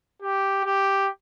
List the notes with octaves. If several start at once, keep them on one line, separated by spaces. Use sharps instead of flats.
G4
G4